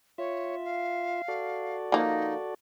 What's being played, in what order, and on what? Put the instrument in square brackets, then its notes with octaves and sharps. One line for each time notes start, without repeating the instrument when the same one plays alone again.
[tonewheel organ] F4 E5 [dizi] C#5
[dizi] F5
[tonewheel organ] F#4 A4 D5
[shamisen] F3 A#3 [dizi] D#4